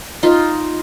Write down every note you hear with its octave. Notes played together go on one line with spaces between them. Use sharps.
D#4 F4